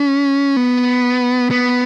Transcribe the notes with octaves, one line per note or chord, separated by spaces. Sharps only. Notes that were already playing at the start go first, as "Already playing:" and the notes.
Already playing: C#4
B3
B3